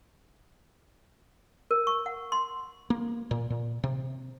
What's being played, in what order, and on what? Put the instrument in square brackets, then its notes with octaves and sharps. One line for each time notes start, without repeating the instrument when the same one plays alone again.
[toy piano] A#4
C#6
F#5
C6
[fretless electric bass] A#3
A#2
A#2
C3